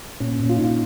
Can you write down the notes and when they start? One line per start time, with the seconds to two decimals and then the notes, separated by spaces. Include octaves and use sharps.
0.20 A#2 C#4
0.40 A#2
0.49 F4
0.57 A#2 D#4
0.64 F4